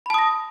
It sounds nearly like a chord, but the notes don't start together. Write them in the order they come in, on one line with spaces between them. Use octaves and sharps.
B5 A5 D#6 A#6